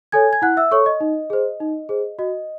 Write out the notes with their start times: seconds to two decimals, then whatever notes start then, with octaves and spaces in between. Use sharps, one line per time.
0.12 A4 C#5 G#5 G#6
0.33 G#6
0.42 E4 F#5 F#6
0.57 E5 E6
0.71 A4 C#5 C#6
0.86 D#5
1.00 D#4
1.30 G#4 C5
1.60 D#4
1.89 G#4 C5
2.19 F#4 D#5